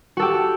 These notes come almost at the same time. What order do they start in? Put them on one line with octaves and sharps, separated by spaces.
F#4 A4 G4